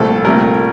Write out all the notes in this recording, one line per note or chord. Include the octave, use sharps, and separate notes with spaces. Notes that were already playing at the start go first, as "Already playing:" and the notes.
Already playing: C2 A#2 F3 A3 A4
C2 A#2 A3 A#4